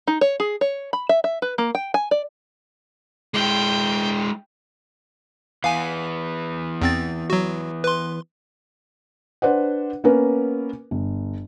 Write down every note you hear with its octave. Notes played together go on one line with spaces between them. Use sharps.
D#4
C#5
G#4
C#5
B5
E5
E5
B4
A#3
G5
G#5
D5
G#3 E4 G5
E3 B3 F5 G#5
E2 C4 A6
F#3 F#4
B4 C6
D4 B4 C5 D5 F#5
A#3 B3 C#4 A#4 B4
G1